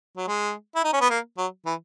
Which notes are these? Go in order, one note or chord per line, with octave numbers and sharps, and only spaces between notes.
F#3
G#3
E4
D#4
C#4
B3
A#3
F#3
E3